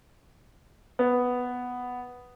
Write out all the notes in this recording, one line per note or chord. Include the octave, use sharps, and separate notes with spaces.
B3